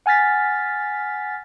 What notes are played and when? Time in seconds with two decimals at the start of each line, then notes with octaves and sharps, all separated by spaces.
0.06 F#5 G#5 F6 A6 B6